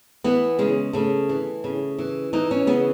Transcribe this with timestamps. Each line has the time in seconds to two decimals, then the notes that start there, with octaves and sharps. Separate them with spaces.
0.24 E3 B3
0.59 C#3 G#3
0.93 C#3 A3
1.29 E3
1.64 C#3
1.99 E3
2.33 E3 D#4
2.51 C#4
2.67 C#3 B3